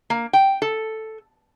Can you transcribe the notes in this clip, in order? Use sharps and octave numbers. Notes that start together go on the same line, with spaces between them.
A#3
G5
A4